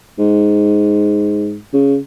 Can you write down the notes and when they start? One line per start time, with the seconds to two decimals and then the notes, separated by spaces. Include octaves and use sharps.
0.19 G#2
1.74 C#3